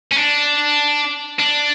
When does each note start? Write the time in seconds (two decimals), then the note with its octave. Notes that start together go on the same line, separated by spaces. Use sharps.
0.12 C#4
0.16 D4
1.39 D4